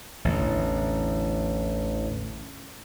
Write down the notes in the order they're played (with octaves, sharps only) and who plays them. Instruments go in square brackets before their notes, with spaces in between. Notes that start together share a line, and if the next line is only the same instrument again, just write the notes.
[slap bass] A1 E2 D3